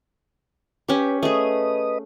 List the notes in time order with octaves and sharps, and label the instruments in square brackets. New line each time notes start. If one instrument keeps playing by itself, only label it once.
[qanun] C#4 G4 [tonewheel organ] B4
[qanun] A3 G#4 [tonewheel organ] B4 D#5 D#6